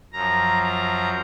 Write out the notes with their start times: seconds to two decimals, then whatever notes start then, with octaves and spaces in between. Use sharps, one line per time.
0.13 F#2 F3 A#5
0.63 A#5